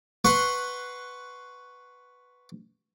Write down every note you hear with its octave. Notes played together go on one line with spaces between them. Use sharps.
B4 F#5 C6 C#6